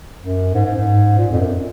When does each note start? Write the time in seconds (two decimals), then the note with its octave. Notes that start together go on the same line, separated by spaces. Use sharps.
0.22 F#2
0.54 G#2
0.65 G#2
0.76 G#2
1.18 A#2
1.31 F2
1.40 F#2